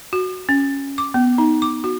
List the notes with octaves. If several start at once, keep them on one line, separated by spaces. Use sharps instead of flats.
F#4
C#4
D6
B3
D#4
D6
F#4